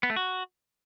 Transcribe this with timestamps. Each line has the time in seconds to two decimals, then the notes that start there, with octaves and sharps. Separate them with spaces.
0.03 B3
0.10 A3
0.16 F#4